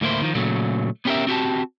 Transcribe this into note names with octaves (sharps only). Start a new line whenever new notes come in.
D2 A2 A#3 E4 C5
D#3 F3
A#2 C#3 F#3 A3
B3 C#4 G4 A4 A#4 E5
C4 F#4 G4 A5